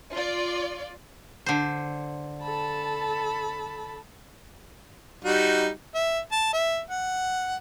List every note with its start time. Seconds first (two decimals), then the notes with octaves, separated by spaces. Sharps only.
0.13 F4 D5
1.46 D3 C5
2.42 A4 A5 B5
5.25 G3 D#4 F#4
5.95 E5
6.32 A5
6.53 E5
6.90 F#5